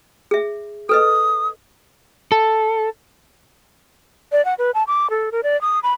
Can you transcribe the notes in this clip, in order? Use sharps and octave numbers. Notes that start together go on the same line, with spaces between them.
G#4 E5
A4 B4 D#5 D#6
A4
D5
F#5
B4
A5
D6
A4
A#4
D5
D#6
B5